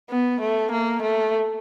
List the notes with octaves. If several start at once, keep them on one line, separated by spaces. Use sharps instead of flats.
B3
A3
A#3
A3